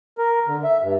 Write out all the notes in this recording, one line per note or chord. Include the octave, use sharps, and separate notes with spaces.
A#4
D3
E5
G2